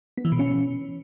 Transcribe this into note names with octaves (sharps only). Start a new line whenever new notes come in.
B3
E3
B2
C#4